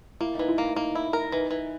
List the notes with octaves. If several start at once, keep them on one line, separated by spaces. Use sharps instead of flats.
A#3 E4
E3 D#4
E4
A#3
A#3 D#4
E4
A#4
E3 D#4
E3